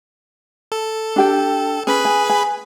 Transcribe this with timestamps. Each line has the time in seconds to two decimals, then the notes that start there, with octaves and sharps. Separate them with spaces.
0.72 A4
1.16 D4 G4 G5
1.87 C#4 G#4 B4 B5
2.05 G#5
2.30 G#5